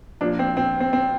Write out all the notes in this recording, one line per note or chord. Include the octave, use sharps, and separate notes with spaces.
A#2 F3 D4
C4
C4
C4
C4